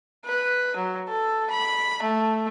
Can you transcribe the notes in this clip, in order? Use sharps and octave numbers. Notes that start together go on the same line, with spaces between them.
B4
F#3
A4
B5
A3